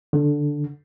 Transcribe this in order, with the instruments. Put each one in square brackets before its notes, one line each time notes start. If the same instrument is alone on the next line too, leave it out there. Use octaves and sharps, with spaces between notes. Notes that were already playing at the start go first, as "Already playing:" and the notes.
[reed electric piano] D3